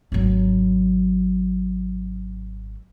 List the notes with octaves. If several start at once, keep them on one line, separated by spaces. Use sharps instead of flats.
G#1 F#3